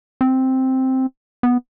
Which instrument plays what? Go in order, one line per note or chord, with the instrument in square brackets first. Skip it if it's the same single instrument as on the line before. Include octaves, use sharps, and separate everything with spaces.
[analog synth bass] C4
B3